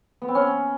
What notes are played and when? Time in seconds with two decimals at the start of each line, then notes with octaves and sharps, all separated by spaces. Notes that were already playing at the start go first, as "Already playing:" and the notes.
0.22 B3
0.28 C4
0.35 C#4